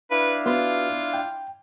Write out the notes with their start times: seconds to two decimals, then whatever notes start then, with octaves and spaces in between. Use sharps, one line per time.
0.11 D4 E4 B4 F5
0.46 B3 F4 F#4 B4
1.14 G5